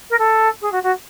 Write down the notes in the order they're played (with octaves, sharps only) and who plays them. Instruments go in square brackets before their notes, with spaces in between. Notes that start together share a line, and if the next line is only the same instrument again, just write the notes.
[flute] A#4
A4
G#4
F#4
F#4